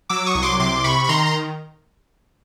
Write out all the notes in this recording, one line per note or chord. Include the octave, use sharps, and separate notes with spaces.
F#3 D6 E6
C#6 D#6
C2
C6 D6
C3 C6 D6
C3 B5 C#6
B5
D#3 A#5 C6
C6